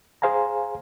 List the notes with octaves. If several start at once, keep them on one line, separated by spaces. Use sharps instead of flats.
G#4 C5 F5 G#5 A#5